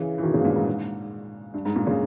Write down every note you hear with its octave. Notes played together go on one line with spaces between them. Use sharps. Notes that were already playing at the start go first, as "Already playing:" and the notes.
Already playing: C#3 E3
E3
B2 D#3
A#2 C#3
G#2
G2 A#2
G#2
G#2
G2
G#2
G2 A#2
A#2 C#3